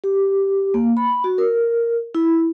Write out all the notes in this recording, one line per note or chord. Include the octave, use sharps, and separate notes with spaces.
G4
A#3
B5
F#4
A#4
E4